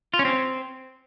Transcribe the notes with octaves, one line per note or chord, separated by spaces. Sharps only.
F4
C#4
C4